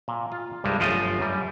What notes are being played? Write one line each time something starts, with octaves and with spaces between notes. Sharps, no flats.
A#2
F4
C2 G2 G3 G#3
G1 F#2 F3 A3 F4 D#5
F#2 G3